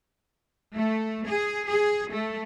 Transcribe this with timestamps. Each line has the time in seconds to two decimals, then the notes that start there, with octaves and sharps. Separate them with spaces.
0.75 A3
1.27 G#4
1.67 G#4
2.12 A3